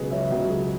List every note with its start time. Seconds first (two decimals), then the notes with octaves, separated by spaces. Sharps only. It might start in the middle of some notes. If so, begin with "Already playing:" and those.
Already playing: C#2 B2 F#3 G#4 B4
0.11 C#5 E5
0.31 C#2 B2 F#3
0.50 G#4